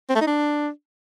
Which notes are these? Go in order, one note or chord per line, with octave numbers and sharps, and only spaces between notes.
C4
A3
D#4
D4